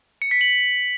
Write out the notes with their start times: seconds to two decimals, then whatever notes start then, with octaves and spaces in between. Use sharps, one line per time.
0.22 C#7
0.31 B6
0.41 F#7